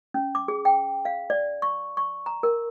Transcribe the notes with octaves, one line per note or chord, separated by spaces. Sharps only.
C#4
D6
G#4
G5
F5
D5
C#6
C#6
A#5
A#4